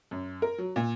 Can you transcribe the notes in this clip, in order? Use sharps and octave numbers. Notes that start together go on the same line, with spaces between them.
F#2
A#4
F#3
A#2